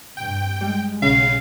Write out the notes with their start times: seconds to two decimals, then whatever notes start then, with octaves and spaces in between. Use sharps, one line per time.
0.17 G2 C3 G5
0.61 G3 G#3
1.02 B1 C#3 F5